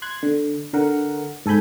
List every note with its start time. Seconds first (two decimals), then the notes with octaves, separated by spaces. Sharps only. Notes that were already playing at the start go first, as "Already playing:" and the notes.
0.02 C6 F#6 G#6
0.23 D3
0.73 D3 A#4 F#5
1.46 G#2 A4 G#5 B5 G6